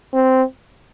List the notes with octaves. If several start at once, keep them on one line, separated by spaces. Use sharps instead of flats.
C4